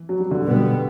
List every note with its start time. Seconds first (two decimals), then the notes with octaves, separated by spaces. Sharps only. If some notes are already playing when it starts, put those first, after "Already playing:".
Already playing: E3
0.09 F#3
0.20 G3
0.31 D3 F#3
0.45 B2 G3 B3